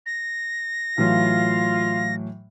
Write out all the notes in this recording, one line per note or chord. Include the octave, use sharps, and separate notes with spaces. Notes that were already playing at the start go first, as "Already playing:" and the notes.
A#6
A2 E3 F#3 F4 F5